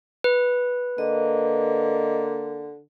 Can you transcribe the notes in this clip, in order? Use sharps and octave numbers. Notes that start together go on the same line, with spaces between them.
B4
D3 A#3 D#5